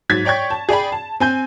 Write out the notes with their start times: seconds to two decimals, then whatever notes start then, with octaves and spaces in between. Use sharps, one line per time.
0.09 G#2 F#3 G#6 A6 B6
0.25 C#5 D5 G5 C#6 G#6
0.50 A5
0.69 G#4 D5 G5 B5
0.92 A5
1.20 C4 G#5 G6